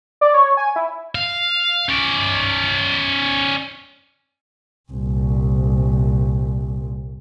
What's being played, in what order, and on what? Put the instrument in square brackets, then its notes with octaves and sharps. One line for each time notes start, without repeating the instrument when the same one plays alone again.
[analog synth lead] D5
C#5
G#5
E4
[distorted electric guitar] F5
C#4 D5
[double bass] C2 A#2